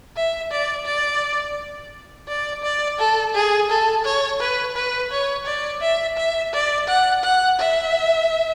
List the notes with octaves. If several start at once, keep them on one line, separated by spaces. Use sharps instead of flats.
E5
D5
D5
D5
D5
A4
G#4
A4
C#5
B4
B4
C#5
D5
E5
E5
D5
F#5
F#5
E5